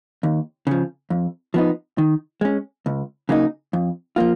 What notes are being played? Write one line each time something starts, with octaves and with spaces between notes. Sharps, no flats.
D#2
C#3 F3
F2
F3 B3 D#4
D#3
G#3 C#4
C#2
C#3 F#3 A#3 D#4
F2
F3 A#3 F4